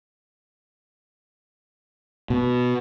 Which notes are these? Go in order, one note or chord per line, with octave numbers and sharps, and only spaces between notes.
B2